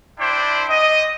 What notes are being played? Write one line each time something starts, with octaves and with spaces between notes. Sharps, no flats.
D4 E4 C5 D5 G5
D#5